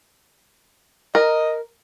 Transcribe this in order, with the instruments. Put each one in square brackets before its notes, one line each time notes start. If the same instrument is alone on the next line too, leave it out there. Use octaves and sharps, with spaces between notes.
[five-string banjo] A#4 [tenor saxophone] D#5